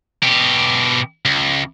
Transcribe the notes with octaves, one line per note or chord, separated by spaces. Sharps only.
B2 G4
C#2